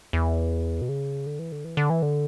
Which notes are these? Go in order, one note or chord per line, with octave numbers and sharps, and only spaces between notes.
E2
B2
C#3
D3
E3
D3
E3
D3
E3
D3